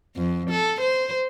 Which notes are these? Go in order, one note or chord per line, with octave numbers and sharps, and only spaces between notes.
F2
A4
C5